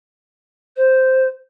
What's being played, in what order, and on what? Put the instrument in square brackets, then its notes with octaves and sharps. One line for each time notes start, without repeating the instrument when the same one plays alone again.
[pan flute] C5